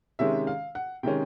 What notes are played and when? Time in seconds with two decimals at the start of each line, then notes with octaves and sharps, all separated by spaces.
0.19 C3 D#3 G#3 C#4 E5
0.47 F5
0.75 F#5
1.03 C3 D#3 G#3 C#4 G5